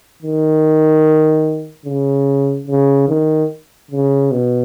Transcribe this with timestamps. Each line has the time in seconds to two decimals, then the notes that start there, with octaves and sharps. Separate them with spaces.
0.22 D#3
1.86 C#3
2.67 C#3
3.08 D#3
3.91 C#3
4.31 B2